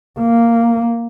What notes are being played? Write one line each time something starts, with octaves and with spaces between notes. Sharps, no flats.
A#3